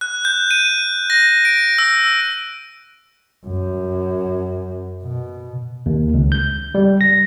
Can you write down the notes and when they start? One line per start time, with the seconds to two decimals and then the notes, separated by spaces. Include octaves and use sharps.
0.01 F#6
0.25 G6
0.51 D#7
1.10 A#6
1.45 D7
1.78 E6
3.47 F#2
5.04 B2
5.86 D#2
6.14 C#2
6.32 G6
6.75 G3
7.01 A#6